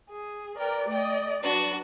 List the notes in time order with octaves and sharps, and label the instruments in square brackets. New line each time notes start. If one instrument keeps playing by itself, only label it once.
[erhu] G#4
[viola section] A#4 B4 [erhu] D5 [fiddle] G5
[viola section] A3 D#5 [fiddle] G5
[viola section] F#3 B4 [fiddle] D4 F#4